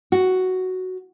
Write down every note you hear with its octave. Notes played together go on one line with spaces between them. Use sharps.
F#4